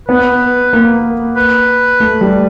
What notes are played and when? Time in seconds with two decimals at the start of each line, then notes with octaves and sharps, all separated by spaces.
0.08 B3 B4
0.73 A#3
1.37 B4
2.00 A3
2.21 G3